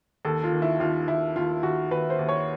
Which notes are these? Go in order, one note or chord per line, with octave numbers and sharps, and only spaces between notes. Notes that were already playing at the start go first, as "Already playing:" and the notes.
D#2 A4
F4
D#3
E4
D#2 F4
D#2 E4
D#2 F4
D#2 F#4
D#2 B4
C5
D#2
C#5